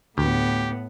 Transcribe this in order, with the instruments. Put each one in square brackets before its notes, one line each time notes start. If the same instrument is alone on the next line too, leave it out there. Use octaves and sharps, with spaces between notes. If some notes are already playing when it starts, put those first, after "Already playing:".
[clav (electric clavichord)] D2 [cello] A2 B3 [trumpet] G4